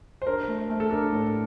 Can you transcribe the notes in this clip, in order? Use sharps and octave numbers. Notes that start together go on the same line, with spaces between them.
C5
D4 A#4
A3
A3
A4
D4 A#4
A2